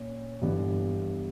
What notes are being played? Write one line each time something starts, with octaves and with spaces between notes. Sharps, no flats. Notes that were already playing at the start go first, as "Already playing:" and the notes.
Already playing: A#2 C#4
G1 G2 E3 B3